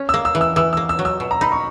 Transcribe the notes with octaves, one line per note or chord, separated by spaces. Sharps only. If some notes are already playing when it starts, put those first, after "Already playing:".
Already playing: C#4
E6
A#3
E6
E3
E6
E3 E6
E6
A#3
E6
F#3
E6
B2
A#5
D#4 B5
C#6